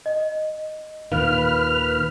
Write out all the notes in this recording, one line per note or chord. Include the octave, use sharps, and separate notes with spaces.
D#5
D#2 A#2 D#3 B4 F5 F6